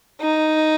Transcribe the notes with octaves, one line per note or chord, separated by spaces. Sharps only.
D#4